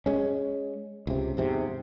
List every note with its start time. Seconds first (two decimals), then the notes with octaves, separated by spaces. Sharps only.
0.06 G#3 C#4
1.07 C#2 C3
1.37 E2 G#2 C3